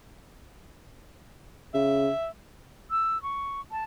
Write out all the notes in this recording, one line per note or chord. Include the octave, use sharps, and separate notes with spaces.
C#3 E5
E6
C#6
A5